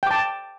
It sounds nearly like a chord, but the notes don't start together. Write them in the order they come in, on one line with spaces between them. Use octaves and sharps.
G5 D6 A5